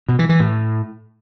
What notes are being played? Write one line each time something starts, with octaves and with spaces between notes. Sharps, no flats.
B2
E3
E3
A2